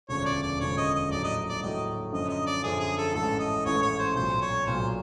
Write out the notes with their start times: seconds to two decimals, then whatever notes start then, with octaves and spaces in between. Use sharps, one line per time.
0.09 E1 D2 C#3 F3 C#5
0.26 D5
0.43 D5
0.60 E1 D2 C#3 F3 C#5
0.77 D#5
0.94 D#5
1.11 A#1 A2 F#3 D5
1.24 D#5
1.49 D5
1.61 A#1 A2 F#3 D#5
2.12 F#2 D3 F3 D#5
2.29 D#5
2.46 D5
2.63 F#2 D3 F3 G#4
2.80 G#4
2.97 A4
3.14 A1 G#2 E3 A3 C#4 A4
3.39 D#5
3.65 A1 G#2 E3 A3 C#4 C#5
3.82 C#5
3.99 C5
4.15 B1 A#2 F#3 C5
4.41 C#5
4.67 B1 A#2 F#3 C5